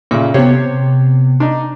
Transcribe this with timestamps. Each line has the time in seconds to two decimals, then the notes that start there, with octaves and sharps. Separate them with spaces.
0.11 A#2 C#3 E5
0.34 C3 B3 G4 C5 C#5
1.40 D4 D#4